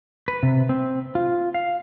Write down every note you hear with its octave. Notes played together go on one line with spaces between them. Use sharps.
B4
C3
C4
F4
F5